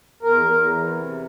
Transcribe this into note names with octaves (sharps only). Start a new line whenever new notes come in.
E2 A#4
E2
E3
C3